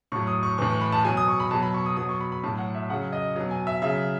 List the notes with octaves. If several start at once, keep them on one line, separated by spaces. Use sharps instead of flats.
A2 F#3 C#6
D#6
C#6
A2 E3 C#6
C#6
B5
A5
B2 F#3 G#5
D#6
C#6
B5
B2 F#3 A5
B5
C#6
D#6
B2 F#3 D#6
C#6
B5
B5
A2 F#3 A5
F#5
E5
C#3 F#3 F#5
D#5
B2 F#3
G#5
E5
C#3 F#3 E5